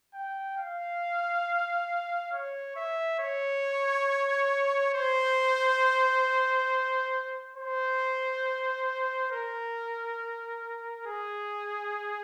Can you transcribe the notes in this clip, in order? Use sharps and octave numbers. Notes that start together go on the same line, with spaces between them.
G5
F5
C#5
E5
C#5
C5
C5
A#4
G#4